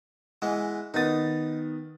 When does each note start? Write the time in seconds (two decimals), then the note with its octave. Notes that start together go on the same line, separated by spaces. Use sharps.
0.42 E3 G#3 B3
0.94 D#3 B3 D#4 D#6 A6